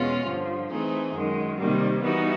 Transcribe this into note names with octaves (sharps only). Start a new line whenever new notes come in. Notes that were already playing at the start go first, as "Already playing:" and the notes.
Already playing: E2 B2 G#3 C#4 F4
G2 D3 F3
E3 A3 C4 D#4 G#4
F#2 D#3 G#3
C3 D#3 G3 A#3
E3 G3 B3 D#4 F#4